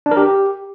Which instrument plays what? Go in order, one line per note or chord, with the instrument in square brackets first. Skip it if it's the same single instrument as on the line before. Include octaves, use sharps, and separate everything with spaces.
[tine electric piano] D4
A#4
G4